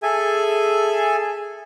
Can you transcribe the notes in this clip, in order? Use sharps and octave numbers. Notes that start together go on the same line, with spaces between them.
G#4 A4 E5 G#5